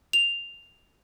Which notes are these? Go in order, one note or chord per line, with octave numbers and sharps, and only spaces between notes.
F7